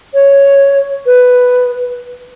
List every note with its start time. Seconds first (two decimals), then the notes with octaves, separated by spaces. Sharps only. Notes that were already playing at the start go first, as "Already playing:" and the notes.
0.14 C#5
1.06 B4